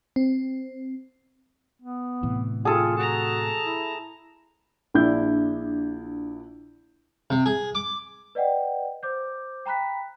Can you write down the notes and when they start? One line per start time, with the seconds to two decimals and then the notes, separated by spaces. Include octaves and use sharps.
0.16 C4
1.82 B3
2.23 A2 C3 E3
2.65 F4 G#4 A4
2.97 F#4 A5 A#5
3.64 E4
4.94 A#1 D4 E4 G6
7.30 C3
7.46 G#4
7.75 D6
8.35 B4 D5 D#5 F#5 G5
9.03 C5 D6 G6
9.66 G5 A#5 B5 F#6 B6